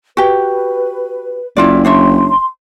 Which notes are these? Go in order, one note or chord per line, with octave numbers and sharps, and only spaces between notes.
F#4 G4 B4
F#1 E4 F4 D5
D4 C#5 E5 C6